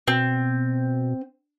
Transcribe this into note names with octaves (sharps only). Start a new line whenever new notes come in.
B2 C4